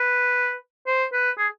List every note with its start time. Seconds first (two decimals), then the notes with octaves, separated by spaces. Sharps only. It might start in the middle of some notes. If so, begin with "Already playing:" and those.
Already playing: B4
0.87 C5
1.13 B4
1.38 G#4